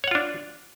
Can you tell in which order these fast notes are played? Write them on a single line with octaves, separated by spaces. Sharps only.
C#5 F#5 F4 D4